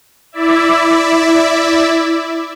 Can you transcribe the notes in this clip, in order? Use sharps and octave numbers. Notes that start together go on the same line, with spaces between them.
E4 D5 E5